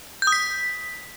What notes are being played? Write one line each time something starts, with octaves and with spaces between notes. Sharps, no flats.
G6
D#6
B6